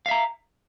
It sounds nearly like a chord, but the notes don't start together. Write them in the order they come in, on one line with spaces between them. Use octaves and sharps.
F5 E5 A#5